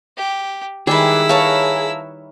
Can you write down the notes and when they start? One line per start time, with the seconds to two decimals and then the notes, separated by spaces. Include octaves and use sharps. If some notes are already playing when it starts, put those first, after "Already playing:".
0.17 G4
0.87 D#3 G3 G#3 E4 G#4 B4 D5 E6
1.29 A#4 B4 C#5 F5 A5 A#5